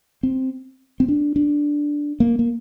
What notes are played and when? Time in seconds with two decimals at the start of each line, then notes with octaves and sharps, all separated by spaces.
0.23 C4
1.00 C4
1.08 D4
1.36 D4
2.20 A#3
2.39 A#3